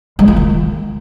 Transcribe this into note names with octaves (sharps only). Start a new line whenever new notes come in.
G#3
F4
D#3